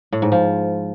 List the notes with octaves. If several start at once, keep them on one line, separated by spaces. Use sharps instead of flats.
A2
G#2
F3